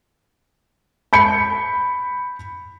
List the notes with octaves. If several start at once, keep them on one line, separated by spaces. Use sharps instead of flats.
B5 G6 C#7